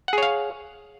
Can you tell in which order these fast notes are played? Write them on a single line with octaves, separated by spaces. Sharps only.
F#5 G#4 C#5 F5